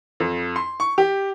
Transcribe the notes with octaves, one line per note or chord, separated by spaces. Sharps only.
F2
C6
C#6
G4